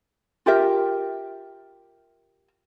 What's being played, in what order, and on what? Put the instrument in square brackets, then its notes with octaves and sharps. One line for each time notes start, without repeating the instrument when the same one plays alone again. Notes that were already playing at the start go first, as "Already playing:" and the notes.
[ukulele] F4 G4 A#4 E5